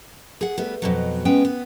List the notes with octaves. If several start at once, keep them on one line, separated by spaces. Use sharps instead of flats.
G#4 F#5
G3 A3 B3
F2 B2 F#3
G#3 B3 C#4 G5
B3